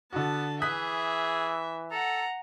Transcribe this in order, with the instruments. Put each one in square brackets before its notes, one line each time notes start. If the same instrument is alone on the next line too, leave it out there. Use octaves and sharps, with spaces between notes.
[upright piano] D3 F#4 [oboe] B3 [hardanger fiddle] A5
[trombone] E3 [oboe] G#4 [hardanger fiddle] E5 [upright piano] D#6 F#6 B6
[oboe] A4 [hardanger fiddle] F#5 A#5